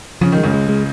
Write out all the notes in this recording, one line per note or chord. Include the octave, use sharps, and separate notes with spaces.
C#3 F3
D#3
G#3
C#2 C#3
G#3
G#3